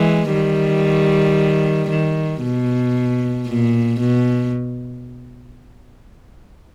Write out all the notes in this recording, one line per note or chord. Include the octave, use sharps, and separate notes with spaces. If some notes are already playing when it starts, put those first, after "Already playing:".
Already playing: E3 G#3
D#3 G3
D#3
B2
A#2
B2